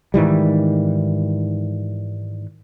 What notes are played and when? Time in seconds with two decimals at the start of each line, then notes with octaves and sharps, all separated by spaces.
0.14 G#2 D#3 E3 G3